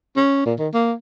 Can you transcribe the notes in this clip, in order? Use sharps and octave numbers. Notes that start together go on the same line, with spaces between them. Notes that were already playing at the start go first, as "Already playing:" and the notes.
C#4
A#2
D#3
A#3